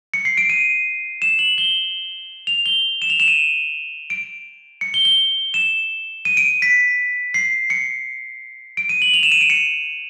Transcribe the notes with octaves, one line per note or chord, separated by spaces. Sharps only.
C#7
C7
D7
D#7
E7
F#7
G7
F7
G7
E7
F7
E7
D#7
D7
C#7
G7
G7
E7
D#7
D7
B6
C7
C#7
D7
D#7
F#7
F7
E7
D#7
D7
C#7